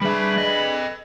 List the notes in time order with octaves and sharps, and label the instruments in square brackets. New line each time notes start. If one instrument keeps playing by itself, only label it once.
[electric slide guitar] G3 E5 [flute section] D4 G#4 B4 [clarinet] B5
[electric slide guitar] A4 D#5